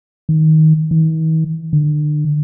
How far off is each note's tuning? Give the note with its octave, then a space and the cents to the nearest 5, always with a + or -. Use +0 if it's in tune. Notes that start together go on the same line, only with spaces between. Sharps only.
D#3 +15
D#3 +45
D3 +30